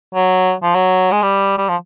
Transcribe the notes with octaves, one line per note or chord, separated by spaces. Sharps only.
F#3
F3
F#3
G#3
G3
G3
F3